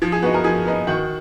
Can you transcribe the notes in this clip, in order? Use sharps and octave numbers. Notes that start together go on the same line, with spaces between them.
F3
G#4
B3 D#4 F#4
A#4
F3 G#4
B3 D#4
D#3 F#4